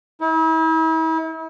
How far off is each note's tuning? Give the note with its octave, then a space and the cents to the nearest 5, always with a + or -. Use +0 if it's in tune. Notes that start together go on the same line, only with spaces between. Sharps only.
E4 -40